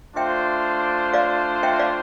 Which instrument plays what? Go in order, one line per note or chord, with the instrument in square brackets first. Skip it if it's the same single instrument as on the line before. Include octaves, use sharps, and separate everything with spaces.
[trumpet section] A3 D4 F4 C5 [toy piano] E5 G5
[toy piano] D5 F5
E5 G5
D5 F5